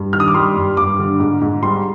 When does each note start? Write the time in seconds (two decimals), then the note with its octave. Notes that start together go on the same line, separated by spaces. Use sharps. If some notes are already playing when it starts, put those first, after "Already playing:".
Already playing: G2
0.13 D#3 F6
0.20 D#6
0.28 D6
0.34 G3 C6
0.56 G2
0.77 G2 D6
0.99 D3
1.20 G#2
1.41 G#2
1.63 G3 C6